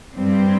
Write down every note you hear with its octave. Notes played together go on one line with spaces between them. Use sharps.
G2 G3 C4